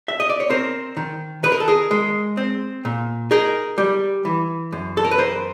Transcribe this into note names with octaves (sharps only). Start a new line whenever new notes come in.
E5
D#5
D5
C#5
C4 A#4 C5
D#3
D#3 B4
A#4
A4
G#4 A#4
G#3
C4
A#2
D#4 G#4 A#4
G3
E3
F#2
A4
A#4
B4
F#2 A#4 C5